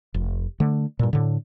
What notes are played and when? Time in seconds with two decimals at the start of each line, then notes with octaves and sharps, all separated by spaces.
0.14 F1
0.60 D3 A3
0.99 G2 A#2
1.13 A2 D3